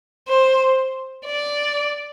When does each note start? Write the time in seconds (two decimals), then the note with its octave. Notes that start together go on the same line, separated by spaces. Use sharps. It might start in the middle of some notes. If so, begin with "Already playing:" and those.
0.28 C5
1.25 D5